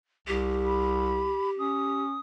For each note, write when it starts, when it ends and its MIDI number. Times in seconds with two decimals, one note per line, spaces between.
0.28 1.39 36
0.28 2.03 67
0.66 1.50 83
1.59 2.19 61
1.59 2.20 87